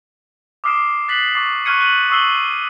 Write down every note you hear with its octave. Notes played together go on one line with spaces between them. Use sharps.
D6 D#6 F6 C7 D7 E7
F#6 A6 B6 C7 F#7
C#6 D6 A6 C7
C#6 F6 F#6 G#6 C#7 D#7
F#6 D#7 F#7
C#6 D#6 E6 C7 F#7 G7